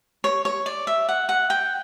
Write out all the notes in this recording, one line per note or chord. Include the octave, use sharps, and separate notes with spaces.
C#5
C#5
D5
E5
F#5
F#5
G5